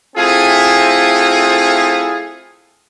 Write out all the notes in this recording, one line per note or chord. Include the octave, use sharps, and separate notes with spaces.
A3 C4 E4 F4 G#4